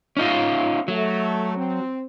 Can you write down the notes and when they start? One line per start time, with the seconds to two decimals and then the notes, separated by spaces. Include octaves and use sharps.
0.17 C#4 D#4 F4
0.88 F#3 A3
1.57 C4